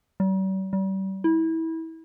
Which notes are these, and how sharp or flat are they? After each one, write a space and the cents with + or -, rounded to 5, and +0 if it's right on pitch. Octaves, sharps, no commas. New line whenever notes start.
G3 -45
G3 -35
E4 -25